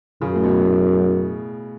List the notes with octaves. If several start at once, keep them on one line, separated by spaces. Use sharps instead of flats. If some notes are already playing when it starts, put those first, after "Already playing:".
F#2 C#3
A2
B2
A2